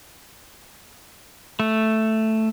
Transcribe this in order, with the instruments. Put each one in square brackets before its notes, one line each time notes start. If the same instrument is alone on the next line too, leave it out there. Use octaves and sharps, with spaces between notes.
[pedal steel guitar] A3